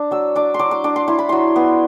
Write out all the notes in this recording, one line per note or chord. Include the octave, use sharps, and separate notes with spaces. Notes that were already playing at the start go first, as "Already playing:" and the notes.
Already playing: D4
F#3 E6
D4 D6
C6
F#3 D6
D6
D4 D6
C6
E4 C6
B5
F#3 C6
B3